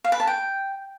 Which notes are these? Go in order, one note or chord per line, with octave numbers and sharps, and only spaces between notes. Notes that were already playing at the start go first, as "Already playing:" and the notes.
F5
B4
A5
G5